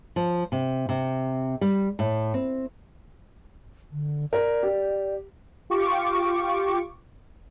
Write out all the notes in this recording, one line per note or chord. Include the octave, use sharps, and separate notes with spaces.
F3
C3
C3
G3
A2
C4
D3
A#4 D5
G4
F4 G4 C#6 D6